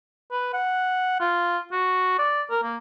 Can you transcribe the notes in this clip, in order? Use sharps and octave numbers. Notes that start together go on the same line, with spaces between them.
B4
F#5
F4
F#4
D5
A#4
A#3